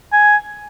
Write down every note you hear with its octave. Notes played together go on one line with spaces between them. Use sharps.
G#5